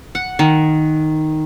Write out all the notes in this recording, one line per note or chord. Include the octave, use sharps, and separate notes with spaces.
F#5
D#3